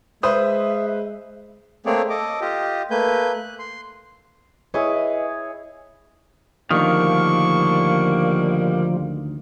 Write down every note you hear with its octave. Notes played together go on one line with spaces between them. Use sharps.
G#3 B4 C5 E5 D#6
A3 A#3 C4 G#4 C#5 D5
A4 D#5 D6
F4 G4 D#5
A3 A#3 B4 G#5 G6
F#6
C6
E4 G#4 B4 C#5 D#5
D2 D3 D#3 F3 G3 A#3 D4 C#6